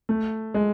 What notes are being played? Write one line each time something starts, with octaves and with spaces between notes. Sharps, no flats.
A3
G#3